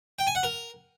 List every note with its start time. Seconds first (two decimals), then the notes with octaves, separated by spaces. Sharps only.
0.19 G5
0.27 G#5
0.35 F#5
0.43 A#4